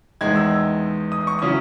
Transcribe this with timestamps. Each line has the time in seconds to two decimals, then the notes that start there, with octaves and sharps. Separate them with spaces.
0.21 E2 D#3 G#3 G#6
0.36 E6
1.12 D#6
1.27 C#6
1.39 C#3 F#3 C#4 E4 D#6